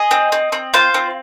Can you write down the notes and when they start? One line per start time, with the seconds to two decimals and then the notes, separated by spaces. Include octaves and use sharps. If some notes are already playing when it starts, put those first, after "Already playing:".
Already playing: G#4 D#5
0.11 C4
0.32 C4
0.52 C4
0.74 F4 C5
0.94 C4